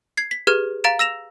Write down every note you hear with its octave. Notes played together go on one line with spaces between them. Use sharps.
G#6 C7
B6
G4 G#4 B4 F6 G#6
F5 A#5 A6 D7 E7
E6 A#6 E7 F7